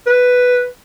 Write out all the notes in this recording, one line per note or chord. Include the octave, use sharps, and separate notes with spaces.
B4